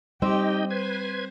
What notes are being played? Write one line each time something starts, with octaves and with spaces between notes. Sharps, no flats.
G3 C4 D#4 G4 D#5 G5
B4 C5 G#6